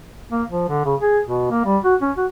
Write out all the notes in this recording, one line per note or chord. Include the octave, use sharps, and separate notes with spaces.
A#3
F3
D3
C#3
G#4
B2
A#3
G3
F#4
C#4
F#4